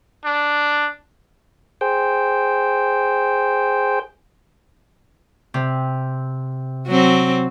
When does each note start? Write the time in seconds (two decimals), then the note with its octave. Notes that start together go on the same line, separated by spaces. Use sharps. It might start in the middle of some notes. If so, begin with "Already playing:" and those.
0.25 D4
1.81 G#4 C5 G5
5.54 C3
6.87 F#3 C4